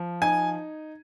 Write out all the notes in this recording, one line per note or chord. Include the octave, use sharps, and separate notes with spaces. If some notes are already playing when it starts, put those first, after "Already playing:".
Already playing: F3
D#4 G#5